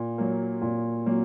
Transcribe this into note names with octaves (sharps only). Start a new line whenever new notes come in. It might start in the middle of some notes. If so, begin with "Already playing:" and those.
Already playing: A#2
F#3 A#3
A#2
F#3 A#3